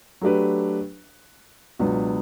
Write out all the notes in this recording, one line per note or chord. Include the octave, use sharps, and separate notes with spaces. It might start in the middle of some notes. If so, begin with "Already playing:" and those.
F#3 A3 D4 G4 B4
C#2 B2 F#3 B3 D4